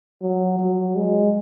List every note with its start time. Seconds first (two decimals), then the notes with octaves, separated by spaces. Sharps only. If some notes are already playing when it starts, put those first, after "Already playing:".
0.22 F#3
0.59 F#3
0.96 G#3